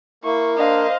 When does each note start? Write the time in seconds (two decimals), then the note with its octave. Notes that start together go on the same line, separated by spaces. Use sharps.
0.24 A#3 E4 C#6
0.58 D4 C5 D#5 F5